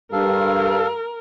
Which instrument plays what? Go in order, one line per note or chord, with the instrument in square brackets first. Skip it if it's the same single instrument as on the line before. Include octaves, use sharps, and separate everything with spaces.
[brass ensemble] G2 [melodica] A4 F5 [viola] A#4